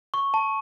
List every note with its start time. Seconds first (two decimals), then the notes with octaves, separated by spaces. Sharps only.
0.14 C#6
0.34 A5